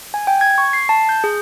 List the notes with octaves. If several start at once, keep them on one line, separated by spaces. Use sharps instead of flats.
G#5
G5
G#6
C#6
C7
A5
G6
G#4